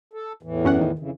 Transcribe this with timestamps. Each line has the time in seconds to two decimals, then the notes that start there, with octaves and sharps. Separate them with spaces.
0.13 A4
0.43 E2 A2 E3
0.64 F#2 C#4 F#5
0.81 D#3
0.99 F2 C#3 E3